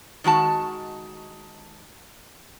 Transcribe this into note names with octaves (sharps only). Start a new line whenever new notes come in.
D#3 G#3 F#4 A5